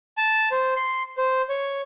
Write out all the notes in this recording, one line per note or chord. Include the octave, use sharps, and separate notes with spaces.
A5
C5
C6
C5
C#5